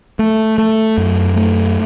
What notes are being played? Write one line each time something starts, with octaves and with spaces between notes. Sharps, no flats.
A3
A3
F#2
A3